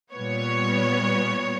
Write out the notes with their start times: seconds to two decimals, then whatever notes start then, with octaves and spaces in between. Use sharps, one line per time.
0.14 A#2 G3 B3 C#5